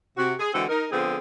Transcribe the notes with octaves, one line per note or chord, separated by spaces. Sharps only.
C3 F#4
G#4
D3 E3 G#3 C4 F#4 A4
D#4 A#4
D3 F3 B3 C4 G#4